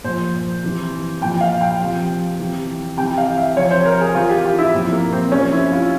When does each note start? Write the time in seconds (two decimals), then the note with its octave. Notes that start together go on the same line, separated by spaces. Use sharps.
0.04 A#2 F3 C5
0.63 C3 E3
1.21 A#2 F3 G5
1.41 F5
1.61 G5
1.80 C3 F3
2.40 C3 E3
2.97 C3 E3 G5
3.18 F5
3.37 E5
3.56 C3 F3 C#5
3.71 C5
3.86 A#4
4.01 G#4
4.14 C3 E3 F4
4.29 G4
4.44 F4
4.59 E4
4.74 A#2 F3 C4
4.92 A#3
5.12 C4
5.32 C3 F3 C#4
5.52 E4
5.72 F4